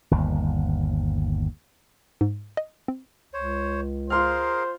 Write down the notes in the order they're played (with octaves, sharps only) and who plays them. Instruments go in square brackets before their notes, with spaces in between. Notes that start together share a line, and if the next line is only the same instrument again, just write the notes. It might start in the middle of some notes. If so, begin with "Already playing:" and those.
[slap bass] G1 D#2
[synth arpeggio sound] G#2
D#5
C4
[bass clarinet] C#2 [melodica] C5 C#5
[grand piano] F4 C6 F6 [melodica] G#4 A#4 F5 [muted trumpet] C5